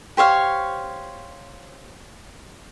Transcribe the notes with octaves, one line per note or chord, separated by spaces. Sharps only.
G4 C5 C#5 F5